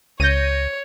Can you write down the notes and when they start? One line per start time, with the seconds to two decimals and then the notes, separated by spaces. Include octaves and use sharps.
0.20 C#2 C#5 G6 A#6 D#7